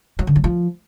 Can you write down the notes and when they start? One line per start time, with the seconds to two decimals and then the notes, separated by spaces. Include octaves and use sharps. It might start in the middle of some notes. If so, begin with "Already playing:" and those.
0.19 F#3
0.27 D3
0.36 F#3
0.44 F3